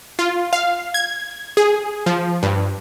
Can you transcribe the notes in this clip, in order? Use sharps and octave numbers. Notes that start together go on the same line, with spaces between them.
F4
F5
G#6
G#4
F3
G2